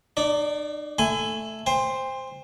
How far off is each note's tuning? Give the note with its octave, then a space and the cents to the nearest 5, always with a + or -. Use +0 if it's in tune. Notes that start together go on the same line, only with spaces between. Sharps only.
D#4 -45 D5 -10
A3 +0 G#5 -5 B5 +45
C5 +0 G5 +40